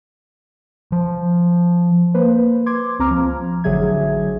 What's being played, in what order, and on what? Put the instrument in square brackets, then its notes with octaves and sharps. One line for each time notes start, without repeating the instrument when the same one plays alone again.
[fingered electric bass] F3
[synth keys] A#3 B4 C5
C6 D6 G#6
C#2 C4 A#5 D6 F6
F3
A1 D3 F#3 G#4 E5 G#6